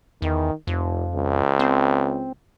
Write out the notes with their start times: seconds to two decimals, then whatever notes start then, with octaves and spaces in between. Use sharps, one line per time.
0.22 E2 D#3
0.67 F1 F2
1.15 C#2
1.59 C4